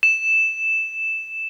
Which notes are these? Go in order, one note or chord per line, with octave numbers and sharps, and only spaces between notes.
E7